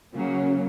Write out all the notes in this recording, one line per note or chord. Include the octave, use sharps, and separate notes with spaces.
C#3 F#3 A#3